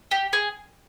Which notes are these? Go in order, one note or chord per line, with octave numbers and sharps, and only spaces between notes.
G4
G#4